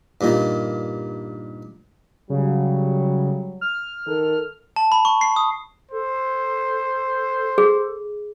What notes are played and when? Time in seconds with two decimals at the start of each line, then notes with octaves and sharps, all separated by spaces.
0.21 G2 A#2 D#3
2.30 C#3 F#3 G3
3.61 F6
4.07 D#3 A4 A#4
4.76 A5
4.92 B5
5.05 C#6
5.21 C7
5.36 D#6
5.92 A4 C5
7.58 G#4